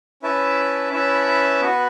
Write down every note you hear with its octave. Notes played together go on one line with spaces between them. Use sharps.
C#4 E4 B4 E5 A5
C#4 E4 B4 E5 A5
B3 F#4 B4